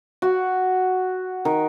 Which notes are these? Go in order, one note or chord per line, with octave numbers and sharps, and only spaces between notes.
F#4
D#3